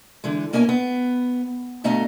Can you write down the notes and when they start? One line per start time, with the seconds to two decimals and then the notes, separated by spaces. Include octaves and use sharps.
0.24 D3 E3 G#3
0.53 B2 A#3 C#4 E4 D#5 G#5
0.69 B3
1.84 G2 B2 A3 D#5 F5 A#5